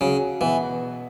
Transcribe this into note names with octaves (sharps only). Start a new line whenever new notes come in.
C#3 F#3
B2 E3 B3